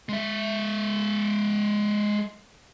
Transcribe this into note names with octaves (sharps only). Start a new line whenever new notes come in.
G#3 E5